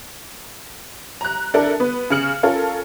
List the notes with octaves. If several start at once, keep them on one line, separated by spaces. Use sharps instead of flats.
A#5 F#6
D4 E4 A4 A#4
B3 B4
C#3 G#4 F6 C#7 F#7
C#4 F4 A4 A#4